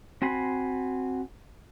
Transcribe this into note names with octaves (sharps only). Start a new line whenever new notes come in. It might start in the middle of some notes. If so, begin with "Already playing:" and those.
C4 F#4 G#5 B5 C6